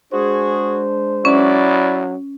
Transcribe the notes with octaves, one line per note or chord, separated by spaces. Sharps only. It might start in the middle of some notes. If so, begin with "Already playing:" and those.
G#3 D4 F#4 G#4 C5
F#3 C#4 E4 D5